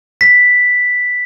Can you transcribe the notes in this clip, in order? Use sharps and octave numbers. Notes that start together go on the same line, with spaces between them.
B6